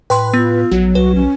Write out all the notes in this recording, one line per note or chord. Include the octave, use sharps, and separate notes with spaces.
A2 B4 G5 C6
B3 F4
A#1 F#3
C2 F#4 B4
B1 C#4